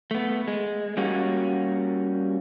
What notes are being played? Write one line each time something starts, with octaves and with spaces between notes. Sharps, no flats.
A3 B3
G#3
G3 A#3 C#4 F#4